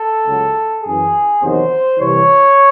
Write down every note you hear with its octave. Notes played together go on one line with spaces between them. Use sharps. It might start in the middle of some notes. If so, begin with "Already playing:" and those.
Already playing: A4
C#2 C#3 F#3
F#2 E3 G#4
E2 C3 D#3 F#3 C5
C2 C3 E3 C#5